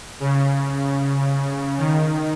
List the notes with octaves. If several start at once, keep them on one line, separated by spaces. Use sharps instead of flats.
C#3
D#3